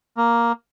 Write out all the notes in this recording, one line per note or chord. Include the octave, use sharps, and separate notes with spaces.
A#3